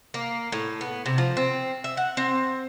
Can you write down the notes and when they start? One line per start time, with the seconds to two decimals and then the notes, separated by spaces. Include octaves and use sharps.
0.14 A#3
0.52 A2
0.81 B3
1.06 C3
1.18 F3
1.37 C4
1.84 E5
1.97 F#5
2.17 C4